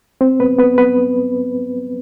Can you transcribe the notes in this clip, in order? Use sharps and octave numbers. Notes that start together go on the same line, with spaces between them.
C4 C5
B3 B4
B3 B4
B3 B4